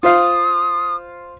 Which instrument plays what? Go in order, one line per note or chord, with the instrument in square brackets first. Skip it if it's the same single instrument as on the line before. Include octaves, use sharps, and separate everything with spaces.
[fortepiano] F4 C5 F5 [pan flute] D#6